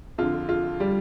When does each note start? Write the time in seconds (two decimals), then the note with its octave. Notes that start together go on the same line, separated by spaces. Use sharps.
0.18 F2 D3 F4
0.49 F4
0.80 G3